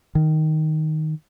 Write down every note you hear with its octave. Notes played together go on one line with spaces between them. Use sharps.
D#3